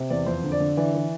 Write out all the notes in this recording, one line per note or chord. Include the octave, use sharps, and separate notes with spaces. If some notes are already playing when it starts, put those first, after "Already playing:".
Already playing: C3
E2 D5
F2 C5
D3
D5
D3
E3 D5
E3